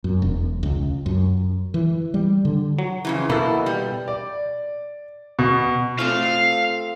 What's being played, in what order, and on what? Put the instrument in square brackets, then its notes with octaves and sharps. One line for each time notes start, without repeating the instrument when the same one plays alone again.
[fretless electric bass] F#2
E1
C#2
F#2
E3
G3
D3
[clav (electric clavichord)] F#3
[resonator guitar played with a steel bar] F2 C#3 E3
[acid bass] B2 [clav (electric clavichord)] A#3 A4 [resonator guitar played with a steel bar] E4
[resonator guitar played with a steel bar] G3
[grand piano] D5
B2
[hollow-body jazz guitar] A3 C4 F4 [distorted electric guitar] F5